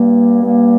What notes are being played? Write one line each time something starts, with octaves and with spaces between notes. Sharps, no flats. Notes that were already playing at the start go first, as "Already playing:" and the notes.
Already playing: G2 G3 A#3
G2 G3 A#3